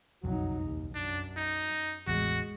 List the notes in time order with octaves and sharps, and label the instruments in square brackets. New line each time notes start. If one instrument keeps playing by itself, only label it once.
[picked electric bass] F#1 B1 F2 [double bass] F#3 D#4
[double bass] D#2
[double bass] F#2 [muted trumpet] D4
[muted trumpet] D#4
[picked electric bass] A1 E2 [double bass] G#3 [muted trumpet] F#4